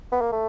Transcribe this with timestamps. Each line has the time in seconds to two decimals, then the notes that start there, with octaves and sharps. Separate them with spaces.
0.12 B3
0.21 A#3
0.32 A3